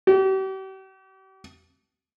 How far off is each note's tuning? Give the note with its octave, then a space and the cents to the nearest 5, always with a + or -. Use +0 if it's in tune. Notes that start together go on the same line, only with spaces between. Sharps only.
G4 -40